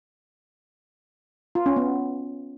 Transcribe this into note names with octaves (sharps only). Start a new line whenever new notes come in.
F4
C#4
B3